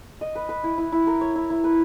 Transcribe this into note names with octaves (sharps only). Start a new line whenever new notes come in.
D#5
B4
B4
E4
E4
E4
A#4
C#5
E4
E4
B4